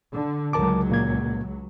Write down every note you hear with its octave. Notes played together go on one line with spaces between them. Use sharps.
D3
C#2 F#3 A#4 A5 D6
A#2 A#3 G#6